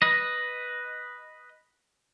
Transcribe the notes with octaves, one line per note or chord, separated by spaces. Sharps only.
B4 D#5